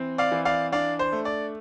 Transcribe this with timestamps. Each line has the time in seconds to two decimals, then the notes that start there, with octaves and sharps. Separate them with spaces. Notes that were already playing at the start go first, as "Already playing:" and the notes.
Already playing: E3 C4
0.18 D5 F5
0.32 E3
0.45 D5 F5
0.72 D4 D5 F5
0.99 C5
1.12 A3
1.25 D5